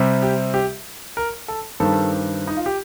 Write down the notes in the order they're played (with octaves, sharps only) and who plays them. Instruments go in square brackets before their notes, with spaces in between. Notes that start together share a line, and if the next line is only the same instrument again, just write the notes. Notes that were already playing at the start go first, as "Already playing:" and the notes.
Already playing: [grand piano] C3 G3 C4
G4
G4
A#4
A4
G2 D#3 G3 C4 A4
D#4
F4
G4